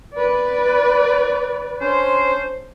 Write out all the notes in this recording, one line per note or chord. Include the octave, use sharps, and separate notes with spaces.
B4 D5
C#4 D4 C5